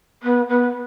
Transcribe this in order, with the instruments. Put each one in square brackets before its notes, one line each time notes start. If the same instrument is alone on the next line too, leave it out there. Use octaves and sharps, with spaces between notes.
[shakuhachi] B3
B3